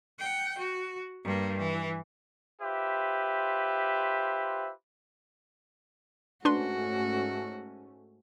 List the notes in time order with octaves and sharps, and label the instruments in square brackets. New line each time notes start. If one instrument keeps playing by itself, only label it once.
[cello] F#5 G5
F#4
G2 A#3
E3
[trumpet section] F4 G4 B4 C5 E5
[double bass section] G#2 A3 C#4 [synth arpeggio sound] D4 B4 C6 [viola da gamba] F#4